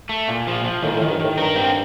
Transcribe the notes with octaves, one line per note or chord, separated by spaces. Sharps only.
A3
A#2
F3
F3
A2 D#3
A2
D#3
G2
A2 D#3
G2 A#4
C4